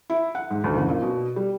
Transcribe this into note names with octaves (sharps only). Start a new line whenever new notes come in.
E4
F#5
G#2
D2
F#1
A#2
B2
G3